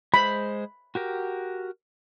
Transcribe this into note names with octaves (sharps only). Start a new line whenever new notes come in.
G#3 C5 B5
F#4 G4 A#4